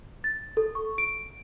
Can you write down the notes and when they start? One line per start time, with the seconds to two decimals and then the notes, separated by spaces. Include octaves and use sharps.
0.24 A6
0.57 A4
0.75 C#6
0.98 D7